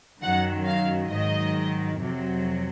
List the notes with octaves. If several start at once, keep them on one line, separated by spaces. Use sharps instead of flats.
F#2 D#3 F#3 F#5
F5
G#2 D#3 F#3 D#5
F2 C3 F#3